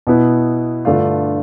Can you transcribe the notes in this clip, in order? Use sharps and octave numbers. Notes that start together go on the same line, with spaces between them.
B2 B3 E4
G2 D3 A3 D4 F4